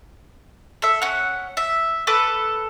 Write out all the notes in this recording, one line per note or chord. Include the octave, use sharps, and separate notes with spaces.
A4 E5
C#4 F#5
E5
A4 B4 D6